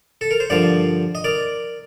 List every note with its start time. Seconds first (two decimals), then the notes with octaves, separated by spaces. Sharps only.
0.21 A4
0.31 A#4
0.40 C5
0.50 G2 D3 F3 A#4 D5
1.15 D#5
1.24 A#4 D5